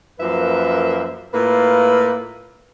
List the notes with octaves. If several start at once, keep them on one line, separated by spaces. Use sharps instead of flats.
F#2 F3 A#3 B4 E5
A2 A#3 F4 B4